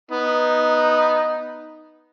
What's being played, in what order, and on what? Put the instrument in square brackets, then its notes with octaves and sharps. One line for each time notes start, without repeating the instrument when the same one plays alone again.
[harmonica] B3 [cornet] D#4